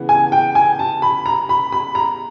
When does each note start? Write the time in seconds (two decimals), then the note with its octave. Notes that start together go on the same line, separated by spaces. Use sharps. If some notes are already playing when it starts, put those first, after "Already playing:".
Already playing: C#3 E3 B3
0.09 G#5
0.32 G5
0.55 G#5
0.79 A5
1.02 B5
1.26 A#5
1.49 B5
1.72 B5
1.95 A#5